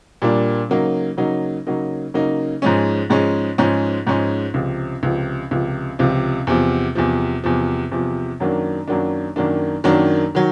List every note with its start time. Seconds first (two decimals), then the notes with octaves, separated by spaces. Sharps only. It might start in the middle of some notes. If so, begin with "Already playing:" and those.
0.22 A#2 G3 A#3 D4
0.70 C#3 F#3 A#3 D#4
1.17 C#3 F#3 A#3 D#4
1.67 C#3 F#3 A#3 D#4
2.14 C#3 F#3 A#3 D#4
2.62 G#2 F3 G#3 C#4
3.10 G#2 F3 G#3 C#4
3.58 G#2 F3 G#3 C#4
4.07 G#2 F3 G#3 C#4
4.54 C#2 C3 F3
5.03 C#2 C3 F3
5.51 C#2 C3 F3
5.99 C#2 C3 F3
6.47 E2 C3 F3
6.95 E2 C3 F3
7.44 E2 C3 F3
7.92 E2 C3 F3
8.40 F#2 D#3 F#3 A#3 D4
8.88 F#2 D#3 F#3 A#3 D4
9.36 F#2 D#3 F#3 A#3 D4
9.84 F#2 D#3 F#3 A#3 D4
10.35 D#3 F#3